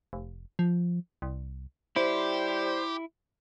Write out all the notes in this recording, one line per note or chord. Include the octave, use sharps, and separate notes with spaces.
F1
F3
C2
G3 E4 G4 C5